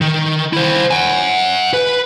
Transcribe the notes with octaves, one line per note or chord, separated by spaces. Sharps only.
D#3
E4 C5
F#5 G#5
B4